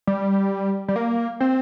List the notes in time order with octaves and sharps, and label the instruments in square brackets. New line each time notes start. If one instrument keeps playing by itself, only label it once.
[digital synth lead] G3
G3
A#3
C4